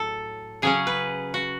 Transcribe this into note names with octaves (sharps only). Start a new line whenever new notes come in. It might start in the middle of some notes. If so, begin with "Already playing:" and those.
Already playing: A2 F#3 A4
C#3 F#3 C#4 G#4
B4
F#4